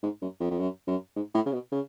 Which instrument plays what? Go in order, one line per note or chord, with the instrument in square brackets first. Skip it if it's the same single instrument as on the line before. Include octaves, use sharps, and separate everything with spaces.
[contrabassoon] G#2
F#2
F2
F2
F#2
F#2
G#2
A2
C#3
B2
C#3